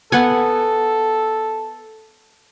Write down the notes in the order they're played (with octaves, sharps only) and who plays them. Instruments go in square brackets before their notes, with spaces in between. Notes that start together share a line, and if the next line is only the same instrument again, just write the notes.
[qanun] B3 F#5 G#5 [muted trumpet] A4